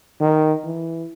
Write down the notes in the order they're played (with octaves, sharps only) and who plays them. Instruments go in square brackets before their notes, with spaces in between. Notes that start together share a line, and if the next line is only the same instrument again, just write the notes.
[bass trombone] D#3
E3